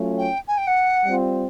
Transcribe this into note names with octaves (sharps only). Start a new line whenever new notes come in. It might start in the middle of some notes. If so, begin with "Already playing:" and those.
Already playing: F#3 A3 C#4 F4
G5
G#5
G5
F#5
G3 C4 F4